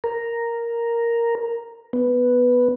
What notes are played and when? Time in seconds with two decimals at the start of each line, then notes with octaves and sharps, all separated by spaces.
0.04 A#4
1.93 B3